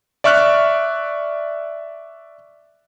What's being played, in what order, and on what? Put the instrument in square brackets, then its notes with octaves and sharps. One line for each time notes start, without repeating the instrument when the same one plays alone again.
[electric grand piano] D5 E5 C#6 F6 F#6